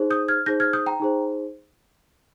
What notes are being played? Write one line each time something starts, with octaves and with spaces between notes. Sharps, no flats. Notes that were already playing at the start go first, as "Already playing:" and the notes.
Already playing: D#4 G#4 C5
D#6 G6
F6 G#6
D#4 G#4 C5 G6 A#6
F6 G#6
D#6 G6
G5 A#5
D#4 G#4 C5